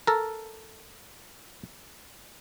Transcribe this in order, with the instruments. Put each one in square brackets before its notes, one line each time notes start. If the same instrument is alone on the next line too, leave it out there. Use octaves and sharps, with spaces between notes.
[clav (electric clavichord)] A4 A#4